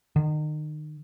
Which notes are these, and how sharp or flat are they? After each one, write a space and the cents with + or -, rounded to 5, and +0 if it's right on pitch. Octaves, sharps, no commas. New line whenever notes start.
D#3 -35